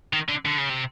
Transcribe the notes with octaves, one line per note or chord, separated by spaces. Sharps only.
D#3
D3
D3
C#3
C3